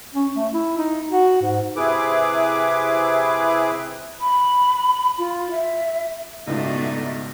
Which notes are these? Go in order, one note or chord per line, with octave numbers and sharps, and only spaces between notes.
C#4
A3
E4
D#4
F#4
G#2
C3 E4 G#4 B4 D6
B5
F4
E5
C#2 G#2 B2 A3 D4 D#4